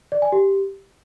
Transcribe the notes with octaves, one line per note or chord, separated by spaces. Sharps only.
D5
G#5
G4